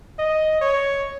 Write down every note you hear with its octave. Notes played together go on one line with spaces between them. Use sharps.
D#5
C#5